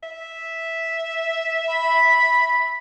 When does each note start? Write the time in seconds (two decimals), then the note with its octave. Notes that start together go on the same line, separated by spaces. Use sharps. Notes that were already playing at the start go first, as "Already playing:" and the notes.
0.03 E5
1.69 B5